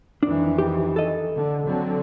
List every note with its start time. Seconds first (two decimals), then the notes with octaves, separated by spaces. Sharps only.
0.23 F2 D#3 E3 D4
0.58 G4
0.96 A4 D#5
1.35 D3
1.66 D3 F#3 C4